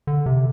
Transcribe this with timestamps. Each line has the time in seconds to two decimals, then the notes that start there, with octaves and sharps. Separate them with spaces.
0.07 D3
0.26 C3